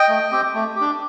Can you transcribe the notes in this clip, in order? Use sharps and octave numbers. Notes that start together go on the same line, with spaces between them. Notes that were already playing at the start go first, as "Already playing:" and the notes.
Already playing: D#5 G5
A3
C4 G4
A3
G4
D4